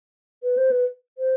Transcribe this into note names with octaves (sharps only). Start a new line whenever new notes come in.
B4
C5
B4
C5